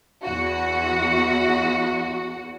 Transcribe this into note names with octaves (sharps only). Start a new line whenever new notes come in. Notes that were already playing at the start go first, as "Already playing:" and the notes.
E2 F#4